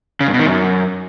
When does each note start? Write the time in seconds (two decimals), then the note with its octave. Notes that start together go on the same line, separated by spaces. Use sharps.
0.20 C#3
0.27 G2
0.33 B2
0.39 D#3
0.46 F#2